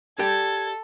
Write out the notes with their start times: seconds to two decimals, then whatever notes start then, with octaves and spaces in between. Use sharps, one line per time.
0.19 G4 A4 D5 G5 G#6